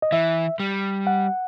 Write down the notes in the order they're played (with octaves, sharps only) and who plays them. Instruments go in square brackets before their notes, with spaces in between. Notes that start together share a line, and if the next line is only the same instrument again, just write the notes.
[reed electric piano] D#5
[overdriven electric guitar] E3 [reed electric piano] E5
[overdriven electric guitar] G3
[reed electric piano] F#5